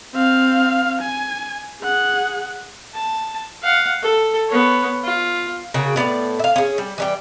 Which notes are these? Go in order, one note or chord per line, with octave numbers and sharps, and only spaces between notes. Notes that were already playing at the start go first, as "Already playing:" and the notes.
C4 F5
G#5
G#4 F#5
A5
F5 F#5
A4
B3 C#5
F4
C#3 F#4 A#4 G5
A2 B3 A4 D5
E5 F5
C#4 G#4
G3
E3 G3 G5